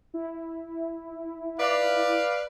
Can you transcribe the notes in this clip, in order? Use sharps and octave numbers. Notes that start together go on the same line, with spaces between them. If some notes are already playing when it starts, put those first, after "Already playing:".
E4
B4 D5 F5